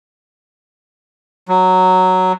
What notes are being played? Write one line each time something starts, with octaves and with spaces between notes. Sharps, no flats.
F#3